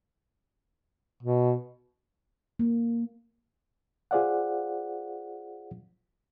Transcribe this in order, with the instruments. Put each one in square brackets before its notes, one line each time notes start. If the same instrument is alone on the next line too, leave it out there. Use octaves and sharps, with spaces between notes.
[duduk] B2
[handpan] A#3
[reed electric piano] F4 G#4 C5 D5 F5 F#5